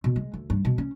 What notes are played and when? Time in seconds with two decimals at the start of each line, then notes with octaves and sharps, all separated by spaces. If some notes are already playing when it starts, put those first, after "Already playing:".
0.04 B2
0.16 G#3
0.34 D2
0.50 G2
0.65 B2
0.78 C#4